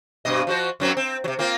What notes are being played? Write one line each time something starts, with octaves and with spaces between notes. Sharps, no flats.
G2 B2 D#5
F3 F#4 C5
F#2 F#3 C4
C4
C3 F#3
A#3 C4 F4